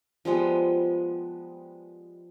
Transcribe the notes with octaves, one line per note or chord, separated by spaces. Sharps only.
F3 G3 G#3 B3